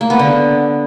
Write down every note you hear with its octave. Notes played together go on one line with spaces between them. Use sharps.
A#3
B3
D3